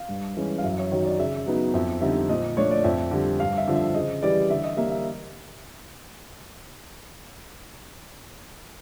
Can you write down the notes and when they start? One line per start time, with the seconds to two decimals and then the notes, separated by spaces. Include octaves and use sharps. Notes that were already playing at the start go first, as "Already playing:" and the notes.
Already playing: F5
0.09 G2
0.37 E3 G#3 C#4
0.58 F5
0.63 F#2 E5
0.78 C#5
0.92 D#3 F#3 C#5
1.05 D5
1.19 C#3 E5
1.46 F#3 B3 D#4
1.74 F2 E5
2.01 D3 G3 C4 D#4 E5
2.29 A#2 D#5
2.57 F3 A3 D4 C#5
2.71 D5
2.84 F2 E5
3.11 D3 G3
3.40 G2 F5
3.58 E5
3.67 D3 F3
3.76 E5
3.95 C#3 D#5
4.22 E3 G3 D5
4.50 D3 E5
4.64 D#5
4.77 G3 A#3 E5
4.91 E5